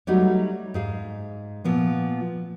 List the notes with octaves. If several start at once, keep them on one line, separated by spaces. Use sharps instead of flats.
F#3 G3 A3 D#4 F#4
G#2 G#4 F5
A#2 F3 B3 F4